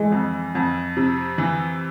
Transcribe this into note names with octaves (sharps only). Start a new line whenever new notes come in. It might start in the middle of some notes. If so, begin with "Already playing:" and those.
Already playing: E3 G#3
F2
F2
C3
E3